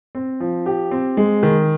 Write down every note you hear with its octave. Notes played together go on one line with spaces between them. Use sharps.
C4
F3
G4
C4
G#3
D#3